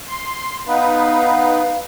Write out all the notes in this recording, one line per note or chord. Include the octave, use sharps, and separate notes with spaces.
C6
B3 D#4 B4 F5